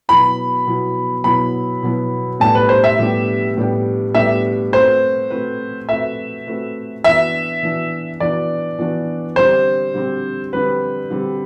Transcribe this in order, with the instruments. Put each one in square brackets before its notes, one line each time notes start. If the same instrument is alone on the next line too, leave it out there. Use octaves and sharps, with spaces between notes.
[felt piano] B2 F#3 B3 E4 [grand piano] B5
[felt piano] B2 F#3 B3 E4
[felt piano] B2 F#3 B3 E4 [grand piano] B5
[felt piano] B2 F#3 B3 E4
[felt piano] A2 G3 B3 D4 G4 [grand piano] A5
[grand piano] B4
C5
E5
[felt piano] A2 G3 B3 D4 G4
A2 G3 B3 D4 G4
[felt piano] A2 G3 B3 D4 G4 [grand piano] E5
[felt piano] A3 C4 F#4 B4 [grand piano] C5
[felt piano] A3 C4 F#4 B4
[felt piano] A3 C4 F#4 B4 [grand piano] E5
[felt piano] A3 C4 F#4 B4
[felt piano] E3 B3 D4 F#4 [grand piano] E5
[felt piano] E3 B3 D4 F#4
[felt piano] E3 B3 D4 F#4 [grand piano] D5
[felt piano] E3 B3 D4 F#4
[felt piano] D3 G3 C4 [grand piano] C5
[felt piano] D3 G3 C4
[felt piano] D3 G3 C4 [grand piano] B4
[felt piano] D3 G3 C4